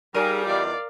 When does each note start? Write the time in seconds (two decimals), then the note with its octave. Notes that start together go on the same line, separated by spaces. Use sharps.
0.14 G3 D#4 G#4 A#4 F5 D#7
0.45 E2 D#4 F4 D5 F5